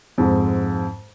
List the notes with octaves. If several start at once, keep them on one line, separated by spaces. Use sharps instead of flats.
F2 G#2